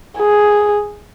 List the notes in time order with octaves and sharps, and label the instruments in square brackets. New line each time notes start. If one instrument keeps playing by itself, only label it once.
[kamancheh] G#4